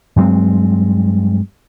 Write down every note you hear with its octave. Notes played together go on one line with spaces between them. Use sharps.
G2 F#3 G#3 C4